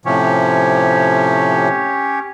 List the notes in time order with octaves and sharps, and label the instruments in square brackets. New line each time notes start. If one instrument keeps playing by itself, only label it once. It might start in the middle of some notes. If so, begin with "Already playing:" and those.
[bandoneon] A2 C3 F3 [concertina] C#4 G4 C#5